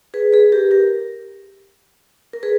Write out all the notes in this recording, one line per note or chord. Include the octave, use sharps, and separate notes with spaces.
G#4 B4
G#4 B4
G4 A#4
G4 A#4
A#4
G#4 B4